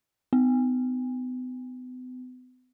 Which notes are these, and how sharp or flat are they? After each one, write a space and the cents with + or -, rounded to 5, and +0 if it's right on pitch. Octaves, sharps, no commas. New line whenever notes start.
B3 +40